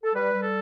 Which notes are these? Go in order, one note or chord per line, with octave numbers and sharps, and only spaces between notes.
A4
G3 B4
G3
A4